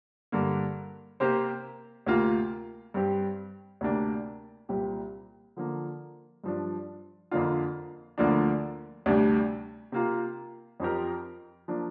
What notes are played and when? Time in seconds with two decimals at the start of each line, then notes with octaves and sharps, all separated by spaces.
0.32 G2 D3 A#3
1.20 C3 A#3 G4 C5
2.07 D2 C3 A#3 F4
2.94 G2 G3 C4 G4
3.81 D2 C3 A#3 D4
4.69 C2 A#2 G3 C4 G4
5.57 D3 F3 A#3
6.44 G2 F3 D4
7.31 F2 D3 A#3 D4 F4
8.18 D2 D3 F3 A#3 D4
9.06 D2 C3 G3 D4
9.92 C3 A#3 F4
10.80 F2 F3 C4 G4 A#4
11.68 F3 A#3 D4